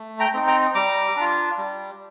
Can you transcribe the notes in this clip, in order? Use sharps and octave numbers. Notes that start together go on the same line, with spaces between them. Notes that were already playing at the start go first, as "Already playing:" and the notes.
Already playing: A3
G5 A#5
C4 D#4
G5 A#5
G3 A#5 D6
D4 F4
G3